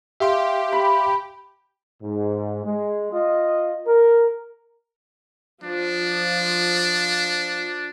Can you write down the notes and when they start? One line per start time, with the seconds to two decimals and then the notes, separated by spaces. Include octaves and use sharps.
0.20 G4 E5 F5 C6
0.72 B5
2.03 G#2
2.65 G#3
3.13 F4 D#5
3.87 A#4
5.64 F3 D4